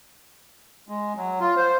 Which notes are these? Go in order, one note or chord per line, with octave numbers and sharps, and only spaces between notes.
G#3
F#3
F4
C5